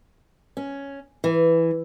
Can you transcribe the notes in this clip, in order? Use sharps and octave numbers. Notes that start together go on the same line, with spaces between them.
C#4
E3